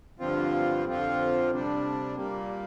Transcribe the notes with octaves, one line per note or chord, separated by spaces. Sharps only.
G2 D3 F3 C4 F4
F2 D3 F3 C4 F4
C3 G3 D4
A#2 G3 A#3